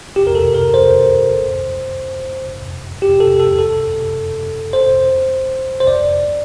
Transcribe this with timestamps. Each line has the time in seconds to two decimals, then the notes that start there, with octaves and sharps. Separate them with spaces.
0.16 G4
0.27 A#4
0.35 A4
0.54 A#4
0.74 C5
3.02 G4
3.20 A4
3.40 A4
3.59 A4
4.73 C5
5.80 C5
5.87 D5